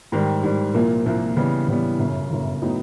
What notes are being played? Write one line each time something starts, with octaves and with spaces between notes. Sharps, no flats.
G#2 D#3 G3
G#2 D#3 G3
C2 A#2 F3 A#3
C2 A#2 F3 A#3
C#3 E3 G3 B3
C#3 E3 G3 B3
G1 F#2 C#3
G1 F#2 C#3
A2 F#3 B3 D#4